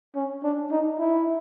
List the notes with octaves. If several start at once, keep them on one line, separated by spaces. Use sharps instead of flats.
C#4
D4
D#4
E4